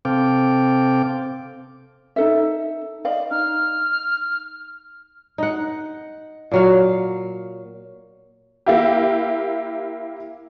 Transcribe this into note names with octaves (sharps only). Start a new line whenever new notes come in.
C3 C4 A4 F5 G5 D6
D#4 A4 E5
D5 D#5 F5
D#4 F6
D#4 F#5
A#2 F#3 F5
A#3 E4 G4